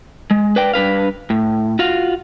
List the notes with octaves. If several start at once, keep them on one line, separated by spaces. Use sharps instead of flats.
G#3
B4 D5 G5
G2 D4 B4 F5
A2
F4 F#4 F5